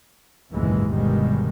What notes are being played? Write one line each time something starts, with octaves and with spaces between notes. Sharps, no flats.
F#1 D#2 G#2 B2 E3 G#3
G1 B2 D#3 G3 G#3